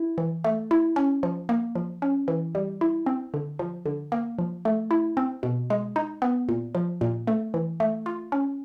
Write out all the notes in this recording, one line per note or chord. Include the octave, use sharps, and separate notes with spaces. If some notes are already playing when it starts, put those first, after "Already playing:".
Already playing: E4
E3
A3
E4
C#4
F3
A#3
F3
C#4
E3
G3
E4
C4
D3
F3
D3
A#3
F3
A3
E4
C4
B2
G#3
D#4
B3
A#2
F3
A#2
A3
E3
A3
F4
C#4